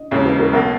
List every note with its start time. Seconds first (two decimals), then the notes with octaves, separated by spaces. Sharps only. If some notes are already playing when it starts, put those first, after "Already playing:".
Already playing: D#5
0.11 E1 D#2 C#3 C#5
0.25 B4
0.39 A#4
0.53 B1 B2 A#3